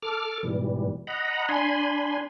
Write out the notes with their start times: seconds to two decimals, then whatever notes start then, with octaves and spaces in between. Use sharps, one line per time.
0.02 A4 D6 F6
0.43 G#2 B2 E3 G3
1.07 D#5 F#5 A#5 B5
1.49 D4 G#5 B5 C6